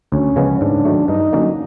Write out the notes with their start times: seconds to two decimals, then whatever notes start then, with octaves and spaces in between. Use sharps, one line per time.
0.12 D2 C#4
0.36 C#3 F3 G#3 B3
0.61 G#2 D4
0.85 D#3 F#3 A3
1.08 G2 D#4
1.33 D3 F#3 A#3 C#4